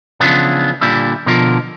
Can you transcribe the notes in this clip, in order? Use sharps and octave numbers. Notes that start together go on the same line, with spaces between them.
C#3 E3 F3 B3 D4
A#2 D3 G3 E4
B2 D3 F3 A#4